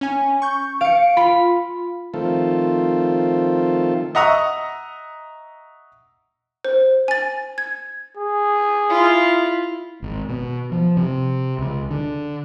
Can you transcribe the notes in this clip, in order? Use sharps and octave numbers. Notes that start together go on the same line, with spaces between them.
C#4 G#5
C#6 G6
F5 C#7 D7
F4 B5
D#3 F3 A3 C4 F4 A4
D#5 E5 F#5 A#5 C#6 D#6
C5
G#5 A6
G#6
G#4
E4 F4
G#1
B2
F3
C3
C#2
D3